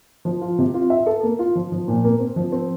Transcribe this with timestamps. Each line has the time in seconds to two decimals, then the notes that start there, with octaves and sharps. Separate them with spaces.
0.25 F3
0.41 F4
0.58 C3
0.74 F4
0.90 E5
1.06 A4
1.23 A#3
1.39 F4
1.55 F3
1.72 F3
1.88 A#2
2.04 A#3
2.20 C4
2.36 F3
2.52 C4